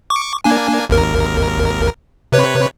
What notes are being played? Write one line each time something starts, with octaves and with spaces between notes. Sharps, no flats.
C#6 D6
A#3 D4 G#5
G#1 D#2 A#4
C3 B4 C#5